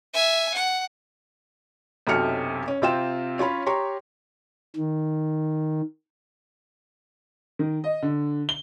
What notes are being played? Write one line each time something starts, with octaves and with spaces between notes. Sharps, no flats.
E5 G#5
F#5
B1 F#2 C3 A4 F6 C#7
C#4
C3 C4 F4 G5 E7
C#4 F4 C#5 B5
G4 C#5 A#5 C6 C#6
D#3
D#3
D#5
D3
G7